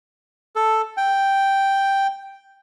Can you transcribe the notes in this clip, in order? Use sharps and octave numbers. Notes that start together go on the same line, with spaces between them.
A4
G5